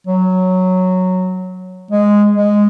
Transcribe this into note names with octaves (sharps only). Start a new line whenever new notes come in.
F#3
G#3
G#3